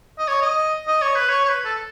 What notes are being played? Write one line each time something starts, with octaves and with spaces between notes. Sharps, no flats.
D#5
C#5
D#5
D#5
C#5
B4
C#5
C#5
B4
A4